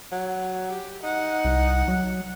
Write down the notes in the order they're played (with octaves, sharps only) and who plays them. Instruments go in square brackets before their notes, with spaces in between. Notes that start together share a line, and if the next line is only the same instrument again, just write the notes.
[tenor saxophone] F#3
[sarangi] G4
[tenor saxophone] D#4 [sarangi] F#5
[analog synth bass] C2
F#3